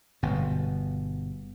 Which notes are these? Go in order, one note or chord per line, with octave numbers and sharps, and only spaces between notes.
G1 B2